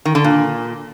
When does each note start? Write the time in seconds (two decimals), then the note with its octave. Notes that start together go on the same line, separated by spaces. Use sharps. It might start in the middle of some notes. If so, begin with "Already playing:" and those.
0.05 D#3
0.15 D3
0.24 A#2